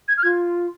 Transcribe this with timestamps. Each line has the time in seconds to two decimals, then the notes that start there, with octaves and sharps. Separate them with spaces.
0.08 G#6
0.18 F6
0.23 F4 G#6